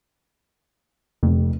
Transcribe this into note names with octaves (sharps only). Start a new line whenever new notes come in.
F1 F2